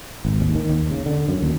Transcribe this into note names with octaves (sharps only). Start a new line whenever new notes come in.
G#1
D#2
D#3
D#2
C#3
D3
F#2
D#2